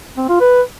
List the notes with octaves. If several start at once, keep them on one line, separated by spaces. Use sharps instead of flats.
C4
F4
B4